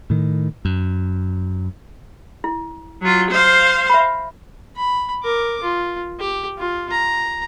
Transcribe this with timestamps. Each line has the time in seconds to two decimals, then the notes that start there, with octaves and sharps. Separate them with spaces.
0.10 A2 D#3
0.65 F#2
2.44 E4
3.02 F#3 F4
3.31 C5 F5
3.89 E5 B5
4.76 B5
5.23 A#4 D6
5.62 F4
6.20 G4
6.58 F4
6.91 A#5